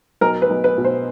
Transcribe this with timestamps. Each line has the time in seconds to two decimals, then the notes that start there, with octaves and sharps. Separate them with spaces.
0.21 B1 A#4
0.42 B4
0.50 B1
0.64 B4
0.78 B2
0.84 C5